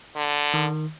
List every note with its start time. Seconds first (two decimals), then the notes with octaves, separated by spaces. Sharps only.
0.16 D3
0.54 D#3